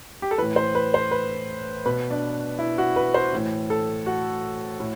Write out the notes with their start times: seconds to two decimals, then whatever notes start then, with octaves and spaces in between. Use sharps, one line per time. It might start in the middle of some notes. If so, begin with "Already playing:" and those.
0.22 G4
0.31 A4
0.38 A2 E3 B4
0.56 C5
0.75 B4
0.94 C5
1.11 B4
1.86 B2 B4
2.11 D4
2.59 E4
2.78 F#4
2.96 B4
3.14 C5
3.33 A2 E3
3.70 A4
4.06 F#4
4.80 A2